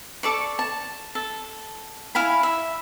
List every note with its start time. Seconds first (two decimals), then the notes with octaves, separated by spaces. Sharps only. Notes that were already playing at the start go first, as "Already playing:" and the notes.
0.23 A4 D5 C#6
0.59 A5
1.15 A4
2.15 E4 F5 G#5 B5
2.43 E5